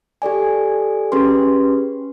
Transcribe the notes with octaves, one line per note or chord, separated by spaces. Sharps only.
G4 A4 D5 G#5
C#4 G4 G#4 B4 C6